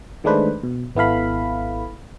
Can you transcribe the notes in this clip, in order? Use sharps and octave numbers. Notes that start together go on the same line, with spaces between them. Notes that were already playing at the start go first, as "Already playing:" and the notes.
D#3 G#3 A3 D4 B4 C5
B2
G#1 B3 E4 A4 F5 B5